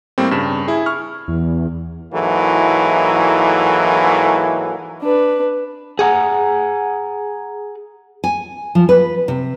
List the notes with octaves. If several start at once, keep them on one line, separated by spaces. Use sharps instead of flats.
A2 G3 A#3 C4
G2 C#3 E7
E4 G#4
C#6 F6
E2
G#2 E3 F#3 A#3 E4 A4
D4 B4
G#4 F#5 G#5 A#5
G#5
F3
B4
C3